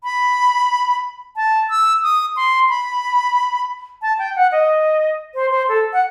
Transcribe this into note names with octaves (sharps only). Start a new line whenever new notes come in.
B5
A5
E6
D#6
C6
B5
A5
G5
F#5
D#5
C5
C5
A4
F#5